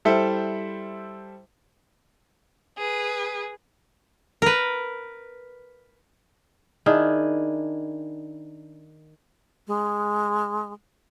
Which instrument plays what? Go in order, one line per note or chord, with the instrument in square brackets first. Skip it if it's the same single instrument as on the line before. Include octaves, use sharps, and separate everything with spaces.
[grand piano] G3 E4 A4 C5 E5
[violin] G#4 B4
[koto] A#4 B4
[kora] D#3 D4 E4 G#4
[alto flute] G#3